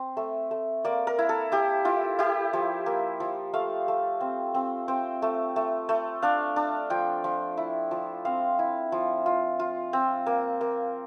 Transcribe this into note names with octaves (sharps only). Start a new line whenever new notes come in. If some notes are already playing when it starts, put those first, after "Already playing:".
Already playing: C4 C5
A3
A3
A#3 D5
A#4
E4
A4
E4 G4
E4 F4
E4 G4
F3
A#3
F3
A3 F5
A3
C4
C4
C4 G5
A3
A3
A3
D4 F5
D4
F3 G5
F3
E4
F3
C4 F5
E4
F3
F4
F4
C4
A#3
A#3